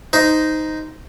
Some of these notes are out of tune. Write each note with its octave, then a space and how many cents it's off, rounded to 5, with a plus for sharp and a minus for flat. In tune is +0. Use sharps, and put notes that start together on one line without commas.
D#4 +0 C5 -15